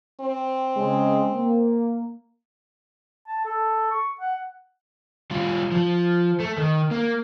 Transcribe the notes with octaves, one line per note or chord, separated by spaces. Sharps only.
C4
C#3 G#3
A#3
A5
A4
C#6
F#5
G3 F4
F3
A3
D#3
A#3